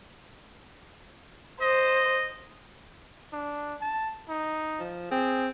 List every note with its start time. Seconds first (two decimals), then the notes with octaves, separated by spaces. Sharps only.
1.61 C5 D#5
3.33 D4
3.81 A5
4.29 D#4
4.79 F3
5.11 C4 G#4